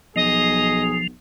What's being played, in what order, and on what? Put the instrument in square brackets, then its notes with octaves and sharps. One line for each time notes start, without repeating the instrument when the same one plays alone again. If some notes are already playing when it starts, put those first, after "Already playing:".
[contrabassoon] B1 [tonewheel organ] F3 [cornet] G#4 [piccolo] D#5